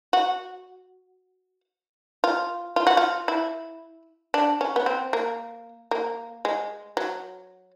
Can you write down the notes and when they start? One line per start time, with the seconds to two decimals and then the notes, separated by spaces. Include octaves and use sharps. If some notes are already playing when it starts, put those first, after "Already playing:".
0.13 F#4
2.24 F4
2.76 F4
2.87 F#4
2.97 F4
3.28 E4
4.34 D4
4.61 C#4
4.76 B3
4.86 C4
5.13 A#3
5.91 A#3
6.45 G#3
6.97 F#3